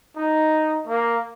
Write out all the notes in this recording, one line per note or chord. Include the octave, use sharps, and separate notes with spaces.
D#4
A#3